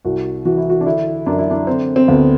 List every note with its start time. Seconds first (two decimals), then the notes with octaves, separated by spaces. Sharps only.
0.05 C2 F#4
0.45 E3 F#4
0.57 E4
0.70 F#4
0.81 D4
0.86 D3 E4
1.26 F#2 D4
1.39 E4
1.51 D4
1.67 D3 C4
1.96 C4
2.08 D2 B3